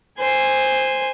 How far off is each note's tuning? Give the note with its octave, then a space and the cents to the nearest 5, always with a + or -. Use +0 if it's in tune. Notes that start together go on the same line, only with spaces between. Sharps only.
C5 +0 G#5 -15